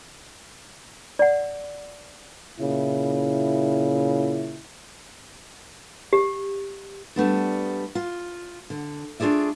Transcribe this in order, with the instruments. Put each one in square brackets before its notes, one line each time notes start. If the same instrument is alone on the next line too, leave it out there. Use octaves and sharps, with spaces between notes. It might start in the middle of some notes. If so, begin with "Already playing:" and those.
[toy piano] D5 F#5
[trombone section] A#2 C#3 E4
[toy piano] G4
[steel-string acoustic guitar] G3 A3 B3 D4
F4
D3
A3 D4 F4 G#4 D5 E5